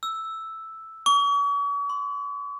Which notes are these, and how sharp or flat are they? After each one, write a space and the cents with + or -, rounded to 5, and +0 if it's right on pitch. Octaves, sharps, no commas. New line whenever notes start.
E6 +0
C#6 +40
C6 -25